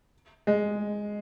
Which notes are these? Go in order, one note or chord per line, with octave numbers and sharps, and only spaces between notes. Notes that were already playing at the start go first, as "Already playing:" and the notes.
G#3